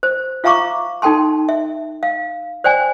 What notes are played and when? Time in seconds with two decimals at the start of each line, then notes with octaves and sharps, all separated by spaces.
0.03 C5
0.44 F4 E5 F5 A#5 C#6 D6
1.02 D#4 A4 G5 A5 C6
1.49 E5
2.03 F5
2.64 C5 D5 G5 G#5